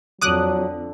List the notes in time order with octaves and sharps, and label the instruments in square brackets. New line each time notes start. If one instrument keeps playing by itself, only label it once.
[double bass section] F2 [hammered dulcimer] D3 [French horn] F#3 [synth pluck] D6 D#6 F#6